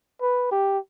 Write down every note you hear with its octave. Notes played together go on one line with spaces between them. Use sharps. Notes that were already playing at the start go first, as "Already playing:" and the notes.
B4
G4